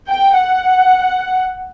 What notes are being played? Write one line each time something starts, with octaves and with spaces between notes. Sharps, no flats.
G5
F#5